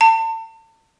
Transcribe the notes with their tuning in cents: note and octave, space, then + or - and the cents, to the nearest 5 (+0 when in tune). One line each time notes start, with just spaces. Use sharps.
A5 +35